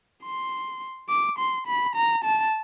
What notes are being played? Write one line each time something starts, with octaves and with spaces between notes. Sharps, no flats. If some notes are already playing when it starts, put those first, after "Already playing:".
C6
D6
C6
B5
A#5
A5